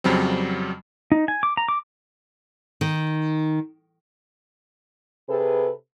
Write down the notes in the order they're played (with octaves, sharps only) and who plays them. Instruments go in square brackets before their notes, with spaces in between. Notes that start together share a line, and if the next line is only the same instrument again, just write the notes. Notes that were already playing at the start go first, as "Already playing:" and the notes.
[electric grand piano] F2 C#3 F#3 G3 C4
[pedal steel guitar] D#4
G#5
D6
A#5
D6
[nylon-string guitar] D#3
[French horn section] C3 G#4 A4 B4